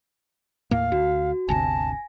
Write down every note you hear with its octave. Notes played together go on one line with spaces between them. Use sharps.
D#2 A2 A#3 F5
D2 F#4
G1 D2 C3 G#5 A5 A#6